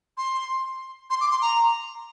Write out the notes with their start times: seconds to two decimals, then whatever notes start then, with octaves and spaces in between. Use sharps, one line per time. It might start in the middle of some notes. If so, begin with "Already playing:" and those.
0.17 C6
1.10 C6
1.21 D6
1.31 C6
1.42 A#5